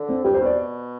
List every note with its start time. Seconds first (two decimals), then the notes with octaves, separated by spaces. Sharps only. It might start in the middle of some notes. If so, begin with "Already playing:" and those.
Already playing: D3
0.09 C4
0.24 G2 G4
0.34 C5
0.40 B2 D5